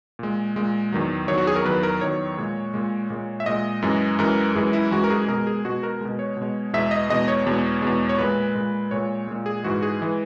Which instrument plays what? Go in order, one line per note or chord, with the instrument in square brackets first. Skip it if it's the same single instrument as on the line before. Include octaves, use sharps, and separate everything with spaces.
[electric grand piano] A#2 G#3
A#2 G#3
E2 D#3 F#3
E2 D#3 F#3 C#5
F#4
G#4
A#4
E2 D#3 F#3 B4
A#4
E2 D#3 F#3 C#5
A#2 G#3
A#2 G#3
A#2 G#3
E5
A#2 G#3 D#5
F#2 E3 G#3
F#2 E3 G#3 A#4
F#2 E3 G#3 G#4
E4
F#2 E3 G#3 F#4
A#4
G#4
B2 G#3 A#4
G#4
B2 G#3 F#4
A#4
B2 G#3
C#5
B2 G#3
E2 B2 G#3 E5
D#5
E2 B2 G#3 D#5
C#5
E2 B2 G#3
E2 B2 G#3
C#5
A#2 G#3 B4
A#2 G#3
A#2 G#3 C#5
A#2 G#3
G#4
G#2 E3 G#3 F#4
G#4
E3 G#3